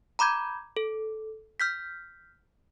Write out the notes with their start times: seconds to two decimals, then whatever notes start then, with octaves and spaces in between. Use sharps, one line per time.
0.19 A#5 B5 D6 G6 G#6
0.77 A4
1.60 F6 G6 B6